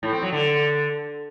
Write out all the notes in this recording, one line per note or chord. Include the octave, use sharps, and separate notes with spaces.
A2
C4
F#3
D3